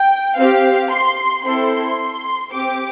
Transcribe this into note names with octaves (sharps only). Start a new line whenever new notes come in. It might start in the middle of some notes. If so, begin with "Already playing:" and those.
Already playing: G5
C4 G4 F5
C6
C4 E4 A4 C6
C4 G4 D6